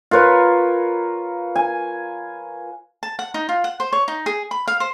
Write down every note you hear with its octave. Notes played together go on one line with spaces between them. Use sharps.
F4 A#4 B4 C#5
G#5
A5
F#5
D#4
F4
F#5
C5
C#5
D#4
G#4
B5
F5
C5